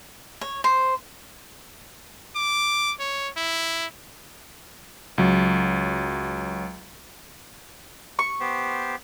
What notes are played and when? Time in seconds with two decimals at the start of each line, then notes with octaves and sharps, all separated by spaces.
0.41 C#5
0.64 C5
2.36 D6
3.00 C#5
3.37 E4
5.18 C#2 F#3
8.19 C#6
8.40 B3 G4 C5